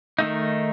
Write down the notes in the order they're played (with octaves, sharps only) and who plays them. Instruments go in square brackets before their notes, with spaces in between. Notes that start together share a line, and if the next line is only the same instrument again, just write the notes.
[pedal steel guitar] D#3 A3 D#4